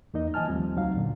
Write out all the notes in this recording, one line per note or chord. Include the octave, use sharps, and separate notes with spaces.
E2 A#3 D#4 D#5
E3 F3 D#5 G#5 A5 F6
D#2 F3 G3 A3 C4
C#2 F#3 D#4 F5
C2 F2 A#2 D3